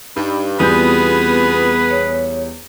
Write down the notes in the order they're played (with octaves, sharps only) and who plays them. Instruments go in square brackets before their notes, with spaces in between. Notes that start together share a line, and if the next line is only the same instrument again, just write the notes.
[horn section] G2 [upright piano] D#4 [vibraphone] B5
[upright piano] E2 G3 G6 [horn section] B3 G#4 [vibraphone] C4 F4 [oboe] B4
[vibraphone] C#5